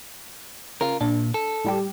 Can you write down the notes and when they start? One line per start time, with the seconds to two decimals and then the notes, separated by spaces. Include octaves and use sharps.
0.81 C#3 F4 A#4
1.01 A#2 D4
1.34 A4
1.65 A2 G3 G4